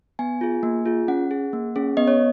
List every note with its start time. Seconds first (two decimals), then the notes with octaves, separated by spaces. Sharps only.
0.19 B3 G#5
0.41 F4 G#4
0.63 A#3
0.86 F4 G#4
1.08 C#4 F#5
1.31 G#4
1.53 A#3
1.76 C#4 G#4
1.97 B3 D#5
2.08 C#5